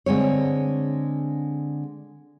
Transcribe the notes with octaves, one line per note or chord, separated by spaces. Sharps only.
D3 G#3 C4 C#5